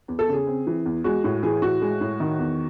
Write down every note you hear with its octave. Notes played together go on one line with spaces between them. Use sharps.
E2
A4
C#3 G#4
C4
E3
E2
G#3 F#4
A2 F#4
E3 G#4
A2 F#4
G#3
A2
D#3
E2